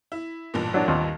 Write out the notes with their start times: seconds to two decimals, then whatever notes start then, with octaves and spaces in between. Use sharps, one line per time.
0.12 E4
0.54 A1 G2 A#2
0.74 F#3 D4
0.88 D#2 C4